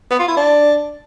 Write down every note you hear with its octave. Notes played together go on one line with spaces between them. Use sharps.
B3
F4
E4
D4